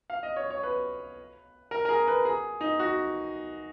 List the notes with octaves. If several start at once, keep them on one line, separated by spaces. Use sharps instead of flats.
F5
D#5
C#5
C#5
B4
A#4
A#4
G#4
B4
G#4
D#4
F#4